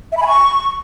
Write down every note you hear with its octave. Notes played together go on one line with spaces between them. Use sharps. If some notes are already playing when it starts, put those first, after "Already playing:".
E5
B5
G#5
C#6